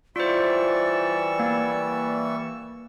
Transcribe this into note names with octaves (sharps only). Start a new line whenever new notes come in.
E3 G3 F4 C5 D5 C#6 E6
A#3